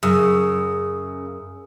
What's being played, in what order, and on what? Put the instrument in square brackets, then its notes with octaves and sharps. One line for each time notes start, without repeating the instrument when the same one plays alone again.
[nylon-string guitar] F#2 [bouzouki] C#3 [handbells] G#4 D#6 E6